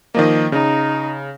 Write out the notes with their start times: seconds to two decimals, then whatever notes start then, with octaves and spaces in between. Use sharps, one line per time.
0.15 D#3 F3 A#3 D#5
0.52 C#3 D#4